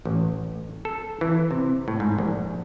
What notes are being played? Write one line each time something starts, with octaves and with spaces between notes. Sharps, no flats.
A1
A4
E3
C3
A2
G#2
A#1